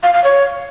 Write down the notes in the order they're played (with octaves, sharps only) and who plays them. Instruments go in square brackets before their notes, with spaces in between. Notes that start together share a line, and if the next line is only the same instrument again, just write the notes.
[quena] F5
F5
C#5